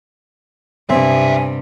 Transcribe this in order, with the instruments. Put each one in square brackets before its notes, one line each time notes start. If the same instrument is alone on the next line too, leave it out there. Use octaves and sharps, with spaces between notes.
[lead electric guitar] B1 E5 [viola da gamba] G2 C3 [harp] C4 [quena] G#5